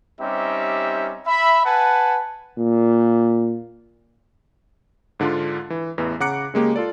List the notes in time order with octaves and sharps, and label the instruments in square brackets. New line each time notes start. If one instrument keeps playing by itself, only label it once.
[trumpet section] G3 C4 C#4 D#4 G4 E5
E5 B5
B4 F#5 G#5 A5
[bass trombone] A#2
[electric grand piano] G#2 D3 D4 F4
E3
A1 E2 E3
C#3 F#5 A#5 D6 F#6 C#7
C#3 G#3 A#3 G4
F4 A4 D5